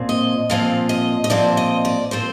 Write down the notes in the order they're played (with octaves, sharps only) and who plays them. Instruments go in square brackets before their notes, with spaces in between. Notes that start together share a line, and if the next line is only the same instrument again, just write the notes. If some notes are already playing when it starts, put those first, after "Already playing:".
Already playing: [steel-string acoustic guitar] A#2 F3 C4
D#5
A#2 F3 C4 F5
D#5
D#5
A#2 F3 C4 D5
D#5
D5
A#2 F3 C4 C5